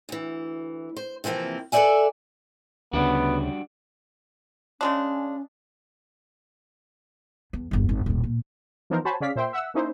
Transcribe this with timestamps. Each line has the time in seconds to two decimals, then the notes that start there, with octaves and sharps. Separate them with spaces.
0.09 D2 E3
0.97 C5
1.24 C3 E3 F3 A#3 C4
1.72 A4 B4 C#5 D5 E5 G#5
2.93 D2 C#3 G3 B3 D4 F#4
4.81 C#3 G#3 C#4 D4
7.53 E2
7.71 G1 E2
7.89 G#1
8.06 D#1 A2
8.24 A#2
8.90 E3 F3 B3 D#4 A#4 C5
9.05 F#4 C5 C#5 G#5 A5 B5
9.20 C#3 C#4 G#4 D5 F5 B6
9.36 A#2 C5 E5 G5 C6
9.53 E5 F#5 E6
9.74 A#3 C#4 D#4 E4 C5